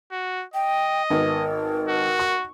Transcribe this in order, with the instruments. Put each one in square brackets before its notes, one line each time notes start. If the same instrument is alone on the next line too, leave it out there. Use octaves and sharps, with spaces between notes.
[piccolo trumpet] F#4
[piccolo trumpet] D#5 [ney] G5
[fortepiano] G#1 B3 [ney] A#4
[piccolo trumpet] F#4
[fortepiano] C#6